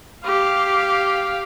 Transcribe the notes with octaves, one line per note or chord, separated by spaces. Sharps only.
G4 F5